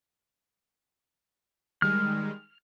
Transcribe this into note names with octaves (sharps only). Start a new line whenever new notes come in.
D#3 G3 G#3 F6